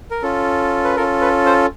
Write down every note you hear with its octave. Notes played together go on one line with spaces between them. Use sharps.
A#4
C#4 F4 A4
B4
C#4 F4 A4 A#4
B4
C5